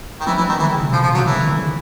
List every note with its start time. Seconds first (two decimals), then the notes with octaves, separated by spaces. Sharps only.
0.20 D#3
0.26 E3 F3
0.38 E3 F3
0.49 D#3 E3
0.59 D3 E3
0.70 C#3
0.82 C3
0.93 B2 F3
1.03 F3
1.09 B2
1.14 F#3
1.17 C3
1.26 C#3 E3
1.36 D#3
1.47 D3
1.58 C#3